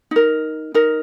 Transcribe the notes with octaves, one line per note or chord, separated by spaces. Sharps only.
D#4 A#4
D#4 A#4